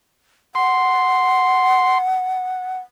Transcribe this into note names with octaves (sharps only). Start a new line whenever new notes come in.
F#5 C6